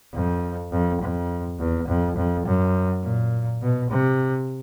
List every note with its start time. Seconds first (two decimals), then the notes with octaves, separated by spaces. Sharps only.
0.13 F2
0.71 F2
1.01 F2
1.59 E2
1.88 F2
2.16 F2
2.46 F#2
3.03 A#2
3.62 B2
3.90 C3